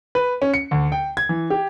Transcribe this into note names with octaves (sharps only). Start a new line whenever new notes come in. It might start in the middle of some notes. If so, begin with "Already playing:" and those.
B4
C#4
C#7
D2
G5
G#6
E3
G4